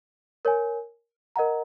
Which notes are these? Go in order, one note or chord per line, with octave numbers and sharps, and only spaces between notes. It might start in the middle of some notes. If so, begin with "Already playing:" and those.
A#4 C#5 G#5
A#4 D#5 F#5 A#5